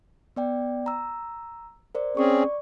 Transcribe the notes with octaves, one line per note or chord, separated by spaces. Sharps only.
B3 D5 G5
A#5 E6
A#4 C5 D5
C4 C#4 G#4 D5 C#6